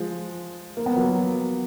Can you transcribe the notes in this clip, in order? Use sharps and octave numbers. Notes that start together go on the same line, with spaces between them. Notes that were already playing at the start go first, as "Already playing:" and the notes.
Already playing: F3 G#3
A#3
B3
F#3 A#3